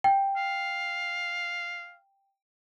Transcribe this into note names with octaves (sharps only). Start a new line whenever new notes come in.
G5
F5